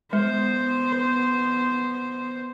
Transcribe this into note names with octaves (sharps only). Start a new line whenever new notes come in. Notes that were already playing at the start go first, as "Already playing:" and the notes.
G#3 B3 C5